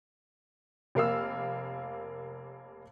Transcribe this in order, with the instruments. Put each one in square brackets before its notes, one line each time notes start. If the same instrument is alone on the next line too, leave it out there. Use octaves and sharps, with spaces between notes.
[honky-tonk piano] F1 A#3 F5 E6